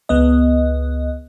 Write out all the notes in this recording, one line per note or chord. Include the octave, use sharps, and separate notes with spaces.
C#2 B3 D#5